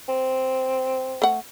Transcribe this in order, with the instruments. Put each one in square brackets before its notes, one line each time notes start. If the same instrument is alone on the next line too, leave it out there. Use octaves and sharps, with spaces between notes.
[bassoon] C4
[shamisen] A3 F#5